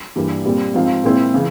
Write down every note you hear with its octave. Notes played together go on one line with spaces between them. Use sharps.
G2 E3 G3 A#3
A#2 G3 C4
G#2 F3 C4 F4
A#2 G#3 C4 E4
C#3 E3